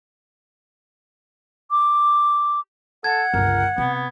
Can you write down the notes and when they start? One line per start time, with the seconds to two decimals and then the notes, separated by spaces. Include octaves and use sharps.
1.71 D6
3.04 A4 F#5 G#6
3.34 G1 C#2 A#4
3.78 C3 B3